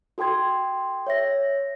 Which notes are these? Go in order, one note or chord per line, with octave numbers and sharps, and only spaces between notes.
F#4 A4 G5 C6 G#6
C#5 E5 A#6